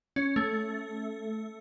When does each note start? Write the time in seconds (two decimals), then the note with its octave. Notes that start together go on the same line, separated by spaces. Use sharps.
0.16 C#4
0.36 A3